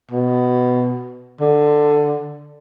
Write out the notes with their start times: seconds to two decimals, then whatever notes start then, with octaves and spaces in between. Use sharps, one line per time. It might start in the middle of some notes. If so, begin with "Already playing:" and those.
0.11 B2
1.41 D3